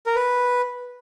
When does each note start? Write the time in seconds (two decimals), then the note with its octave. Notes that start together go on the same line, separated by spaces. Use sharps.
0.06 A#4
0.15 B4